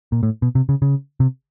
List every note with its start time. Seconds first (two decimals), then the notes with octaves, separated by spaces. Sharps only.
0.12 A#2
0.23 A2
0.42 B2
0.55 C3
0.69 C#3
0.82 C#3
1.20 C3